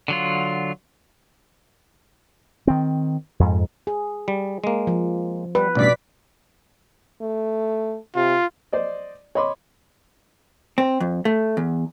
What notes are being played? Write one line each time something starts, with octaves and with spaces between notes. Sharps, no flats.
D3 F#3 F4
D#3 C4
F2 G#2
G#4
G3
G#3 A#3
F3
G3 B4
A1 G2 B2 D5 B6
A3
C3 F4
C5 D5 D#5
C#5 D#5 B5 C6 D6
C4
F2
A3
E2